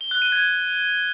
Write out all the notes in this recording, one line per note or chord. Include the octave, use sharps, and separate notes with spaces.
G7
F#6
D#7
G#6